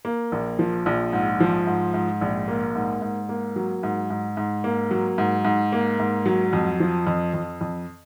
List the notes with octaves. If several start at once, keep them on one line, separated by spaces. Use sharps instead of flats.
A#3
A#1
F3
A#1
G#2
F3
G#2
G#2
A#1
A#3
G#2
G#2
A#3
F#3
G#2
G#2
G#2
A#3
F#3
G#2
G#2
A#3
G#2
F#3
F2
F3
F2
F2
F2